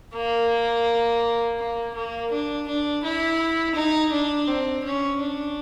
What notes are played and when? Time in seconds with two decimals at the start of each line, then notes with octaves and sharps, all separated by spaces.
0.15 A#3
1.59 A#3
1.94 A#3
2.32 D4
2.68 D4
3.04 E4
3.75 D#4
4.12 D4
4.48 C4
4.85 C#4
5.20 D4